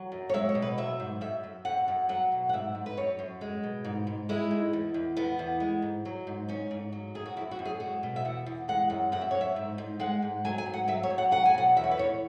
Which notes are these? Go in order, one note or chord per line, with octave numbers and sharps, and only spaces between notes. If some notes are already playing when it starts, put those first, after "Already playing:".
Already playing: F#3
F#2
C#5
G#3 E5
C#5
B2
B4
F#3 E5
G#2
F#2 E5
F#2
F#2 F#5
F#2
F#3 F#5
B2
F#5
G#2 E5
G#2
B4
F#2 C#5
F#2
G#3
B2
G#2
G#2
G#3 E4
G#2
E2
E2
E2 B3
E2
G#3
G#2
F#3
G#2
G#2 C#4
G#2
F#3
F#2 G#4
F#4
F#2 E4
F#4
F#2
G#4
G#3 F#4
B2
E5
E2 F#5
E2
G#3 F#5
F#2
F#2 F#5
E5
F#2 C#5
E5
G#2
G#2
G#3 F#5
G#2
F#3 G#5
G#5
G#2
F#5
F#3 E5
C#5
F#2
F#5
F#3 F#5
G#5
B2 F#5
E2 E5
C#5
B4
E2 C#5